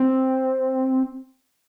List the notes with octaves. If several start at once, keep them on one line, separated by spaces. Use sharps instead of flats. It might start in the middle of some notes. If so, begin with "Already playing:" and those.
Already playing: C4